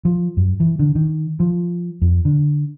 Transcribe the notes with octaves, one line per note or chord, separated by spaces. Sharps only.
F3
F#2
E3
D3
D#3
F3
F2
D3